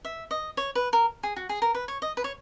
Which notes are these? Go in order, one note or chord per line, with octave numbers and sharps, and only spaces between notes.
E5
D#5
C#5
B4
A#4
G#4
F#4
G#4
A#4
B4
C#5
D#5
B4
C#5